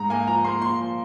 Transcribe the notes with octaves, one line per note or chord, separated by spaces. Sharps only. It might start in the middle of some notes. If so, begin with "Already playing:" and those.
Already playing: G#2 A#5
A#3 G#5
F3 A#5
A#3 C6
A#2 C6
F3